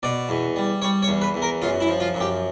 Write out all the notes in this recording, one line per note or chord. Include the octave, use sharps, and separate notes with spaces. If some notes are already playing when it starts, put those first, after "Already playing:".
B2 D5
E2
G3
G3 C#5
C#5
E2
B4
E2
A#4
F#2 F4
E4
F3
F4
F#2
G4